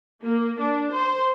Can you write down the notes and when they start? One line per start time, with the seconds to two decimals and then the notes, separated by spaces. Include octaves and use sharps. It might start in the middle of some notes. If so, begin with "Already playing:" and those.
0.23 A#3
0.60 D4
0.93 C5